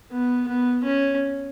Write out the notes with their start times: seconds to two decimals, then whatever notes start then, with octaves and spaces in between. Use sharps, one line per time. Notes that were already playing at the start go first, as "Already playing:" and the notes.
0.11 B3
0.48 B3
0.84 C#4